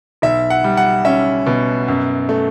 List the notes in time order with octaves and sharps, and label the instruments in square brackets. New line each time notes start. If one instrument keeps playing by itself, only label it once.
[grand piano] B1 E5
F#5
G3
F#5
C#4 E5
B2
F#2
A3